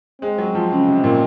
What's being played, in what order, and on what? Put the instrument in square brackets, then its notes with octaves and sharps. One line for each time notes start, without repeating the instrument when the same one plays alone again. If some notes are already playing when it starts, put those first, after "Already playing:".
[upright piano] G#3 [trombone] C4
[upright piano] F#3
F3
C#3
C3
A#2